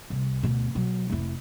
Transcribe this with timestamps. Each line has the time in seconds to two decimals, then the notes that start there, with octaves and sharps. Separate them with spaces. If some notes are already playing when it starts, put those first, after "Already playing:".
0.10 C2
0.43 D2 B2
0.75 B2 F#3
1.10 F1 E4